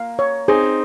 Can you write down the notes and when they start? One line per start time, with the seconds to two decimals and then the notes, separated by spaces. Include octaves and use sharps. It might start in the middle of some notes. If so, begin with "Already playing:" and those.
Already playing: A#3 F5
0.19 C#5
0.48 C4 D#4 G#4